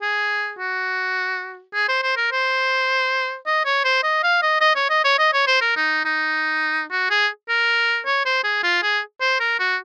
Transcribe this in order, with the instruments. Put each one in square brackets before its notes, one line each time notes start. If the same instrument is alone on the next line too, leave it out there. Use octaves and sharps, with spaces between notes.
[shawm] G#4
F#4
G#4
C5
C5
A#4
C5
D#5
C#5
C5
D#5
F5
D#5
D#5
C#5
D#5
C#5
D#5
C#5
C5
A#4
D#4
D#4
F#4
G#4
A#4
C#5
C5
G#4
F4
G#4
C5
A#4
F#4